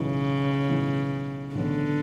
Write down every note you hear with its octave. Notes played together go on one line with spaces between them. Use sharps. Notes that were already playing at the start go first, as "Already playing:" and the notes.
Already playing: B1 A2 C#3 E3 B3
B1 A2 E3 B3
B1 A2 D3 E3 B3